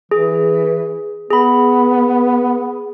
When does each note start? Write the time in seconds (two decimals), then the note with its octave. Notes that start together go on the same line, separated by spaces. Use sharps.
0.11 E3 G#4
1.31 B3 G#4 B5